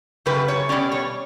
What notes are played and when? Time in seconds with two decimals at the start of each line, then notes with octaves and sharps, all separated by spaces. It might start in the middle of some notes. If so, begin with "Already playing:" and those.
0.26 F#2 C#3 G3 B4
0.48 C#5
0.69 B2 G3 C#4 D5
0.92 C#5